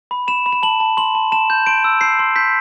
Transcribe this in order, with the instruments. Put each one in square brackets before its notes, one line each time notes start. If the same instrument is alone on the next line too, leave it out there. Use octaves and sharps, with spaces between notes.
[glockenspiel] B5
B5 E7
B5
E7
A5 F#7
A5
C6 F#7
A5
A5 E7
G6
C6 D7
E6
G6 C7
C6
G6 B6